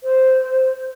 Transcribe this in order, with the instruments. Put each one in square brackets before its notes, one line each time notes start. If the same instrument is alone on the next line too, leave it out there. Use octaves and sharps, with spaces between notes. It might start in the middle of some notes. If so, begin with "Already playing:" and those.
[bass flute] C5